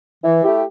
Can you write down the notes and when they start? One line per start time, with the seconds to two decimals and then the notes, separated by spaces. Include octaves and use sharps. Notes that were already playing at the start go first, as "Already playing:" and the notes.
0.24 E3
0.43 A3 E4 G4